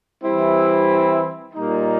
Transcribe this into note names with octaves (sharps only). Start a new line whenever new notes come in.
E3 G3 C4 E4
A#2 G3 A#3 D#4